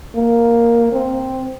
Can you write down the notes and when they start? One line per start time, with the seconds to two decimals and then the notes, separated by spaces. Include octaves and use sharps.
0.15 A#3
0.92 C4